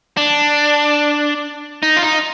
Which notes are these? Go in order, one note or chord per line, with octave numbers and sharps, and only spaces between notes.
D4
D#4
F4
D#4